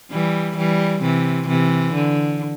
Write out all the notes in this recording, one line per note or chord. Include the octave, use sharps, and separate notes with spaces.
E3 G3
E3 G3
C3 E3
C3 E3
D3